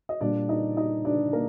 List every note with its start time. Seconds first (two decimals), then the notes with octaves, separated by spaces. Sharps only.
0.09 D#5
0.21 A#2 G3 D4 D5
0.49 D#4 D#5
0.77 D#4 D#5
1.05 D4 D5
1.33 A#3 A#4